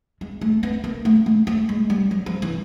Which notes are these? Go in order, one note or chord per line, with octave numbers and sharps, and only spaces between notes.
G#3
A3
B3
A#3
A3
A3
A3
G#3
G3
F#3
F3
E3